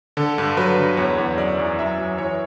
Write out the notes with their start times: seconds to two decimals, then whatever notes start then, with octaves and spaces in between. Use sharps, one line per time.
0.17 D3 A4
0.38 G2
0.57 F#3 B4
0.78 D3
0.97 E2 C#5
1.18 E2
1.37 F#2 D5
1.58 E3
1.79 F#2 E5
1.98 F#3
2.18 E3 C#5